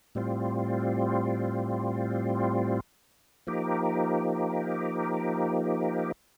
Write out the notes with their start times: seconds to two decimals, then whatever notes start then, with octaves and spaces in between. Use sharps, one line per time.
0.15 A2 G3 C4 F4
3.47 F3 A#3 D#4 G4